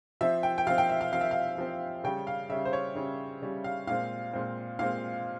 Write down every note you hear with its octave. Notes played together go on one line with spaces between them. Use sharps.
F3 C4 E5
G5
G5
F3 C4 F5
G5
E5
F5
F3 C4 F5
E5
F5
F3 C4
C#3 G3 C#4 G5
F5
C#3 G3 C#4 E5
C5
C#5
C#3 G3 C#4
C#3 G3 C#4
F5
A#2 G#3 C4 F5
A#2 G#3 C4
A#2 G#3 C4 F5